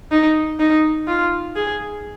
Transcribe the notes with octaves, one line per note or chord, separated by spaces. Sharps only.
D#4
D#4
F4
G#4